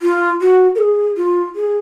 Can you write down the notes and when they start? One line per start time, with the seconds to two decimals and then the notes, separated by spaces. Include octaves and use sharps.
0.02 F4
0.41 F#4
0.75 A#4
0.78 G#4
1.17 F4
1.55 G#4